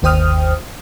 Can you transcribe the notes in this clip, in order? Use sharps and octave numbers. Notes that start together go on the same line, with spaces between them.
G1 D#2 C5 G5 D#6 F6